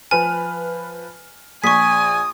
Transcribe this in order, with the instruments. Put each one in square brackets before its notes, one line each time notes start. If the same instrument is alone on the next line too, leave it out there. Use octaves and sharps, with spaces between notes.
[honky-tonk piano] F3 B4 F6 [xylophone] G#5
[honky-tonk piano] A#1 [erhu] G#5 [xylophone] C#6 B6 [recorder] D#6